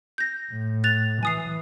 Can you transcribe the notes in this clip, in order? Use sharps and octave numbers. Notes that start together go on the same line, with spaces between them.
G6 A#6
A2
F#6 A6 F7
E3 G#5 D#6 C7